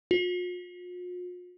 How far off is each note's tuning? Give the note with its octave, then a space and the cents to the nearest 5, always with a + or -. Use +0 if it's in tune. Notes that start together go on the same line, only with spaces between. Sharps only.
F4 +45